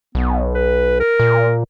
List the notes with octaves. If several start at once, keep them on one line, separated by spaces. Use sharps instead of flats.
B1 B3
B4
A#4
A#2